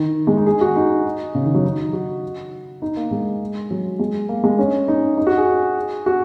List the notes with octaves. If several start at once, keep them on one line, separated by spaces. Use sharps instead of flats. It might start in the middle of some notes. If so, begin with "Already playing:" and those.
Already playing: D#3
G#3
D#4
G#4
F#4
D#4
C#3
D#3
F#3
D#4
F#4
D#4
A#3
G#3
F#3
G#3
A#3
G#3
C#4
D#4
D#4
F#4
G#4
F#4